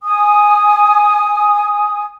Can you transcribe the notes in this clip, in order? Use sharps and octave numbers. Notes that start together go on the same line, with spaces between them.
G#5 D#6